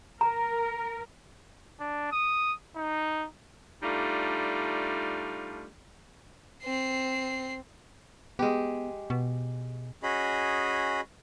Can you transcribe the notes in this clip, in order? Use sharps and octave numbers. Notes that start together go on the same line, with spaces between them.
A#4 A#5
D4
D#6
D#4
G3 A3 D4 D#4 F4
C4 C7
G#3 B3 G4
B2
C#4 F#4 G#4 D#5 B5